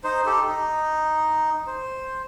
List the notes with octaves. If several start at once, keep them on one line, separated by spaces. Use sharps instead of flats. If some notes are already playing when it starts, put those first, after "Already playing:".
D#4 C5
D#4 G4 A4
D#4
C5